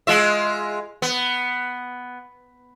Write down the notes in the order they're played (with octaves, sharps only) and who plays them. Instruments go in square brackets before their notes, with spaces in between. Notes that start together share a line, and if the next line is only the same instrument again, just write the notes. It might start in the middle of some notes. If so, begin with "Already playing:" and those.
[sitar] G#3 F4 E5
B3